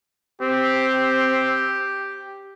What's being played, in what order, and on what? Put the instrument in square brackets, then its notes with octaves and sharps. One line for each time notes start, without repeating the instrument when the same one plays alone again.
[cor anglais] C4 [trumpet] G4